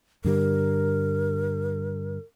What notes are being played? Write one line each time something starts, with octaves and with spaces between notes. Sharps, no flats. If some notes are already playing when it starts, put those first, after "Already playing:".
G2 D3 G3 A#4